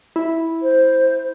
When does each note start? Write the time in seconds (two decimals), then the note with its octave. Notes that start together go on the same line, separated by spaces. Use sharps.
0.16 E4
0.63 C5